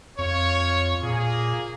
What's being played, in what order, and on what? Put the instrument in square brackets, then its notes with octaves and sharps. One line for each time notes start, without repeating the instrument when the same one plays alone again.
[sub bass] F2 [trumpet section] F4 C#5
[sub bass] A#2 [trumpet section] A#3 G#4